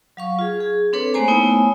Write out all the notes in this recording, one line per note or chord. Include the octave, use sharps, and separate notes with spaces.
F#3 F5 C#6
F4 G#4
G#4
C4 D4 A4 B4 C#5
A3 A#3 C5 G#5 A#5
A3 B3 D#4 E4 C#5 G#5